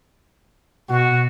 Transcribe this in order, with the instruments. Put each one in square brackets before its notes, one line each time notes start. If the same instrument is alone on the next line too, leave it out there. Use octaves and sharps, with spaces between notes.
[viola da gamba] B2 [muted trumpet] F#4